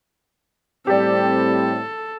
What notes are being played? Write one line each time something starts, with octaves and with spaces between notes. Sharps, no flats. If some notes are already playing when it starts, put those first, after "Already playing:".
A2 G3 C4 G4 A4 D5